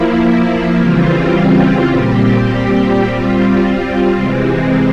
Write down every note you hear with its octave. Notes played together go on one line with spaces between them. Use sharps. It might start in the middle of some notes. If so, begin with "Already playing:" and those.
Already playing: F3 A#3 E4
C#3 E3 G3 C4 F4
A#2 G3 C4 G4
G3 C4 F4
C3 E3 G#3 C4